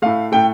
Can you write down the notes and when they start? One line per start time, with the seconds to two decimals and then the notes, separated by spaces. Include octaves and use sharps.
0.02 A2 A3 F5
0.32 A2 A3 G5